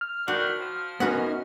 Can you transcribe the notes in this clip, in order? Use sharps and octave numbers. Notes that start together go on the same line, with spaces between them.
F6
A2 D#3 D4 F#4
F3
F#2 B3 C#4 D#4 F#4 F#5